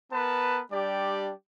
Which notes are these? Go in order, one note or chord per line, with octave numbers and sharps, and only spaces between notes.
B3 A#4 B4 A5
G3 D4 G4 D5